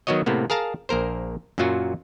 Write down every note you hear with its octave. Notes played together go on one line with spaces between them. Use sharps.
D#3 F#3 B3 F#4 C#5 D#5
A2 C3 A#3 B3
G#4 A#4 F5 A5 A#5
A#1 A#3 A#4 C5
F#2 A#2 F#3 F4 F#4